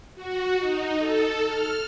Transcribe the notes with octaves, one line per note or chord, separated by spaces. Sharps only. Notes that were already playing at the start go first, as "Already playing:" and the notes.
F#4
D#4
A4
F6